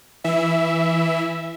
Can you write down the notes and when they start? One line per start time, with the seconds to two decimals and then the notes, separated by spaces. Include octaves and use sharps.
0.24 E3 E5